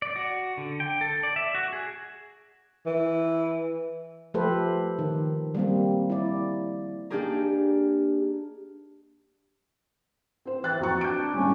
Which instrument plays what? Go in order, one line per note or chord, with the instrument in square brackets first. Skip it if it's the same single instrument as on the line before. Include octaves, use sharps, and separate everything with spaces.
[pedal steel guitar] D5
F#4
D3
G5
A4
D5
E5
F#4
G#4
[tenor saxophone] E3
[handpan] F3 A3 G4 A4 B4 C5
D#3
G3 A#3 C4
E4 D5
[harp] A#3 D4 D#4 G4 G#4 A#4
[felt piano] C4 C5
[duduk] E3 [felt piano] F#6 A6
[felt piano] F2 A#5 C#6 [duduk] F#4
[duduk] D4 [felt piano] G6 D7
[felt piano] G#1 G3 [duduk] C#4